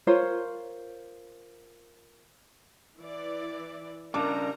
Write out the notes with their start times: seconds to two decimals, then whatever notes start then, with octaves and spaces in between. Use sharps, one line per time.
0.07 F4 A#4 C5 C#5
3.00 E3 D5
4.14 C#3 G3 D4 A#4 A5 A#5 D6